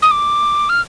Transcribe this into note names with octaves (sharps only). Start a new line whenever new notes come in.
D#6
D6
F6